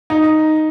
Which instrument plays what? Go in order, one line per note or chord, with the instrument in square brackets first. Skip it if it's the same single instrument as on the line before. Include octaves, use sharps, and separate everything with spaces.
[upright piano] D#4